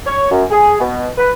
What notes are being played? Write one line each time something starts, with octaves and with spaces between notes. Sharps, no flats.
C#5
F#2
G#4
B2
B4